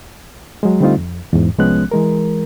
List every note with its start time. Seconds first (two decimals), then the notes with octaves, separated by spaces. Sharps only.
0.63 F#3 G#3
0.80 D3 G3 A3 C4 D#4 F4
0.97 F2
1.33 E2 G#2
1.58 C2 F3 G#3 B3 C#4 F#6
1.91 E3 G#3 A#4